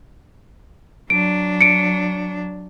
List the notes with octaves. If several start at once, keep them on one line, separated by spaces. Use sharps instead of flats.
F#3 D4 D7
C#7 D7